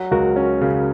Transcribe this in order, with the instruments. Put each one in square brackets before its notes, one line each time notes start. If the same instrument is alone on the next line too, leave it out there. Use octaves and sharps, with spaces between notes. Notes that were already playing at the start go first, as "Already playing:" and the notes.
Already playing: [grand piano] F#3
[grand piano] C#2 [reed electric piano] F#4 A#4
[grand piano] C#4
C#3